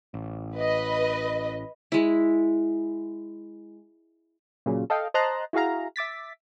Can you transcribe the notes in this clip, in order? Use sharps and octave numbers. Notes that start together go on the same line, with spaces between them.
A1
B4 D#5
G#3 E4
A#2 C#3 F#3
A4 D#5 F5 G5
C5 D#5 A5 A#5 C6 F#6
E4 F#4 G#4 F5 A#5
E5 D6 A6 B6